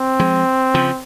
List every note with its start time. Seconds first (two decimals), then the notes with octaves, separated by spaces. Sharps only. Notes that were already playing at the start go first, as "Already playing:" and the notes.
Already playing: C4
0.19 F3 G#3
0.74 C#3 F3